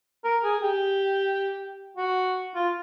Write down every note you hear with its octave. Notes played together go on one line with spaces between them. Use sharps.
A#4
G#4
G4
F#4
F4